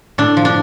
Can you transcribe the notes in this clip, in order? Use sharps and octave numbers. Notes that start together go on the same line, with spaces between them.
A2 D4
F3
D4